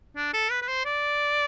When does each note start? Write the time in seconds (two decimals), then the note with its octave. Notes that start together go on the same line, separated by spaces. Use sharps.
0.16 D4
0.33 A4
0.51 B4
0.62 B4
0.68 C5
0.85 D5